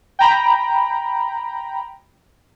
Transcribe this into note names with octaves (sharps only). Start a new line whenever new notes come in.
G5 A#5 B5